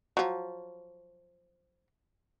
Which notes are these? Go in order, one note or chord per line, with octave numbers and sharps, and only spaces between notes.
F3 F#3